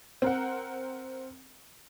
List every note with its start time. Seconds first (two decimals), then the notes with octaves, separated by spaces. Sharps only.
0.22 C4 A#4 F#5